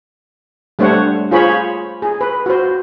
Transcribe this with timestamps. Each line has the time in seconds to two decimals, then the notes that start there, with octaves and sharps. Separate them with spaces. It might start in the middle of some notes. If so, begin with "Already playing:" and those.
0.79 G3 A3 D4 C5 C#5 F#5
1.31 F4 G#4 C5 C#5 B5
2.02 G#4
2.21 B4
2.46 F#4 C5